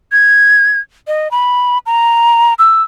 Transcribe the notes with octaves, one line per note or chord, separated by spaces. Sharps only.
G#6
D#5
B5
A#5
E6